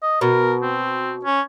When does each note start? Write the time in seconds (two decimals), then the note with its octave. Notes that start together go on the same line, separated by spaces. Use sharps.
0.03 D#5
0.21 B2 A#4
0.63 C4
1.25 C#4